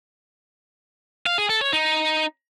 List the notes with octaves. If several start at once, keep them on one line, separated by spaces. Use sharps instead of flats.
F5
G#4
A4
C#5
D#4